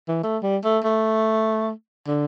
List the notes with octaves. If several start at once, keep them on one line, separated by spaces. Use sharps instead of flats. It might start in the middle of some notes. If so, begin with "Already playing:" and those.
E3
A3
G3
A3
A3
D3